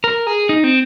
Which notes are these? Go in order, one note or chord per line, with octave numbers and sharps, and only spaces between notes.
A#4
G#4
D#4
C4